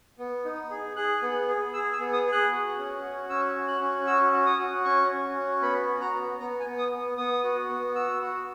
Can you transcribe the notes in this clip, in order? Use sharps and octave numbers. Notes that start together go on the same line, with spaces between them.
B3
D#4
G#4
G#4 F#6
B3
G#4
G#4 E6
E6
B3
D#6
G#4
F#6
F#4
C#4
F#4
C#4 E6
F#4
F#6
C#4
F#4 E6
F#4
D#6
F#4
C#4 C#6
C#4
F#4
B3 B5
F#4
A#5
B3
B3 A#5
G#5
B3
D#6
B3
B3 D#6
F#4
B3
F#4 E6
F#4